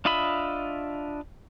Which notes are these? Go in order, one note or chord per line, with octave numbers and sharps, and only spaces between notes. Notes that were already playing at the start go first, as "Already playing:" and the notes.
D4 F4 D#5 E5 B5